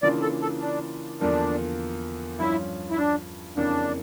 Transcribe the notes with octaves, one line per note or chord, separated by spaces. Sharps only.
C#3 E3 A#3 D4 F4 D5
A4
A4
D4
E2 D3 F3 A#3 D4
G2 F3 C#4 E4
E4
D4
F2 C#3 E3 A#3 C#4 D4